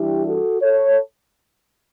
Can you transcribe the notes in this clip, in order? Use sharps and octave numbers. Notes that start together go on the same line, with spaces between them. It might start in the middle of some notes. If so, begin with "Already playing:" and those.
Already playing: E3 G3 D4 E4 G4
F#4 A4
A4 C#5